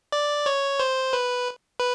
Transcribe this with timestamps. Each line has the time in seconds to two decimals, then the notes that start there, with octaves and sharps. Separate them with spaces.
0.12 D5
0.46 C#5
0.80 C5
1.13 B4
1.80 B4